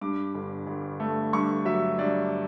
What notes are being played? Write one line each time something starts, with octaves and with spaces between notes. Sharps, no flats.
G2 D6
G1
G1
A3
G2 C#6
F#3 E5
G2 D5